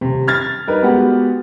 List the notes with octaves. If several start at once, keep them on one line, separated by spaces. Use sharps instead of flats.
D#1 C3
F6 G#6 A6
G3 D#4 A#4 B4
G#3 B3 F#4 G4 F#5